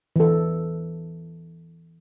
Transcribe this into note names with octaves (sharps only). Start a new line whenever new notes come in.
E3 A4